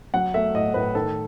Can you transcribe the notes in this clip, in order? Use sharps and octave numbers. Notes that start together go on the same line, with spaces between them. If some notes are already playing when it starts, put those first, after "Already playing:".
F#3 F#5
A3 E5
A2 D#5
A2 B4
D#3 A4